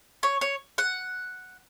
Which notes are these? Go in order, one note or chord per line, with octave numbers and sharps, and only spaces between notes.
C#5
C#5
F#5